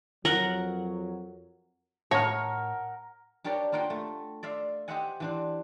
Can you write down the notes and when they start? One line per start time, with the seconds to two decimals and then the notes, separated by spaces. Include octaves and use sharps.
0.25 F2 F#3 A#4 F#5
2.11 A2 A#4 C#5 E5 F#5 A5
3.44 D4 G4 A#4 C#5 D5 G5
3.72 A#3 F4 A#4 F#5 G5
3.90 A3
4.43 D5 E5 F5 C6
4.88 G4 C5 D#5 E5 F#5 G#5
5.20 E3 D4 C5